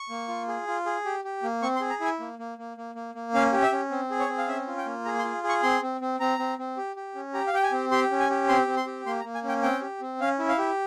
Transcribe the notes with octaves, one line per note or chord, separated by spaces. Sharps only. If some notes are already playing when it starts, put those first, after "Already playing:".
Already playing: C#6
A#3
F4
G#4
F4
G#4
G4
G4
A#3
C4 C#6
C6
G#4
A#5
E4 G#5
A#3
A#3
A#3
A#3
A#3
A#3
C#4 F5
G4
E5
C#4
C4
G#4
C#5
C4
F5
C#4 E5
F4
G5
A#3
G#4 A#5
C6
F4
G#4
C#6
C4 C6
C4
C4
C4 A#5
C4
C4
G4
G4
C#4
G4 A#5
F5
G4 G5
G#5
C4
G4 C6
C#4
G#5
G4
C4 C6
C4
C6
G4
A#3 C6
A#5
A#3
G#5
C#4
G5
C4 G5
G4
C4
C#4 F5
E4
F5
G4